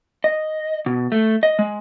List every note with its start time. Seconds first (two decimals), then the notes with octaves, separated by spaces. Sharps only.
0.24 D#5
0.86 B2
1.12 A3
1.43 D#5
1.59 G#3